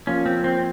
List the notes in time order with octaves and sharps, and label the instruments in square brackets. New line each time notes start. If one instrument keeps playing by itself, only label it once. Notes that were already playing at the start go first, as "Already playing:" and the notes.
[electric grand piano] F3 A#3 F4 [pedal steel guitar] C#4
[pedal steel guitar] C4
C4